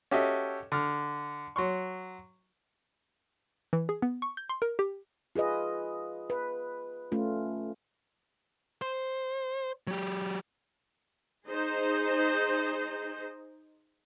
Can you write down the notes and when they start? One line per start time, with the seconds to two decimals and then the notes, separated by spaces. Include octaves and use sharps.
0.11 C#4 F#4 G4 A4 D#5 E5
0.72 D3 F6
1.56 F#3 C6 C#6
3.73 E3
3.89 G#4
4.02 B3
4.22 C#6
4.37 G6
4.49 C6
4.62 A#4
4.79 G4
5.36 F4 G#4 B4 D#5
6.30 B4
7.12 A3 C#4 F4
8.81 C5
9.87 F#3 G4
11.47 D#4 G#4 C5 D#5